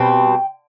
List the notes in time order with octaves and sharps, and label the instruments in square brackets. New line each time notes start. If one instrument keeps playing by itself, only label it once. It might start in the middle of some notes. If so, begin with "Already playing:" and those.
Already playing: [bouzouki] B2 G3 C4 G5